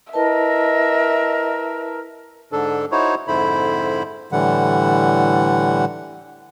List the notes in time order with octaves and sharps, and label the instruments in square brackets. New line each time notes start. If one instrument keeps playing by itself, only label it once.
[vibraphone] E4 B4 A5 [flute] A#4 [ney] D#5 [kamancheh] E5
[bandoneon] G#2 D3 D4 A4
D#4 E4 F#4 C5 C#5
F2 G#2 D3 E4 C5 B5
A2 D3 E3 G3 F#5